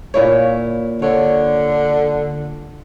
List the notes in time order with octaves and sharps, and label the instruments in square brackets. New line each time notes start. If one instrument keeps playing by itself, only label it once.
[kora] A#2 E4 C#5
[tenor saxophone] D3 [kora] C#5